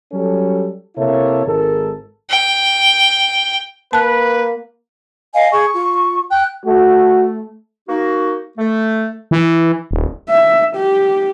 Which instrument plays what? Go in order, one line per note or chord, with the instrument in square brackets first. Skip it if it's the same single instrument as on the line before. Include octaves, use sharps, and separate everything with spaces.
[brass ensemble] F#3 G3 C#4 A4
C3 A#3 E4 A4 C#5 E5
G#1 G#2 G#3 A4 A#4
[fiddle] G5
[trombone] A#3 [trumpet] B4 [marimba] A5 F#6
[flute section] D#5 F5 G#5
[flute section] G#4 [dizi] C#6
[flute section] F4
[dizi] G5 [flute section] F#6
[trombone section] A3 [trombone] F#4
[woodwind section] A#3 D#4 F#4
A3
[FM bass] E3
D#1
[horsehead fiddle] E5
G4